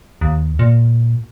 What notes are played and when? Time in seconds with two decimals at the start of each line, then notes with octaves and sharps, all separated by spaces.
0.21 D#2
0.59 A#2